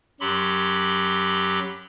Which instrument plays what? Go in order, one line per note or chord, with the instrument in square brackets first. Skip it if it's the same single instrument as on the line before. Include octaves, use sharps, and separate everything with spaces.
[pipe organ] F#2 F#3 G4 B5 C6